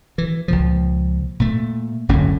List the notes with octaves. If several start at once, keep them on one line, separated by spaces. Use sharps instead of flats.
E3
C#2 A#2 F3
A#2 A3
F#1 D2 A2 C#4